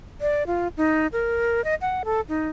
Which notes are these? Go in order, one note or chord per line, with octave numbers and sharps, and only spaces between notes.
D5
F4
D#4
A#4
D#5
F#5
A4
D#4